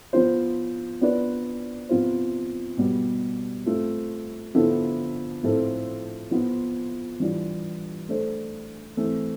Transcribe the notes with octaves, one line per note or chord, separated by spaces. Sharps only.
F3 B3 F4 C5
B3 D4 F4 B4 D5
C3 F3 B3 F4 C5
B2 G3 B3
A3 C4 F4
D3 F3 B3 E4 A4
A2 F3 C4 F4 A4
F3 B3 F4
E3 G3 D4 F4
A3 D4 A4 C5
E3 A3 C4